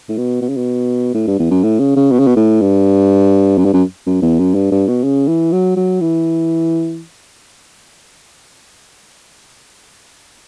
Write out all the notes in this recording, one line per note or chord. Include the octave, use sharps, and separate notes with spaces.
A2
B2
B2
C#3
B2
A2
G2
E2
F#2
A2
C#3
C#3
B2
C#3
B2
A2
G2
F#2
G2
F#2
F#2
E2
F#2
G2
G2
B2
C#3
E3
F#3
F#3
E3